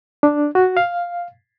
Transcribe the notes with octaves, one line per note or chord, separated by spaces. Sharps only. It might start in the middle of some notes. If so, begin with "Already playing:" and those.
D4
F#4
F5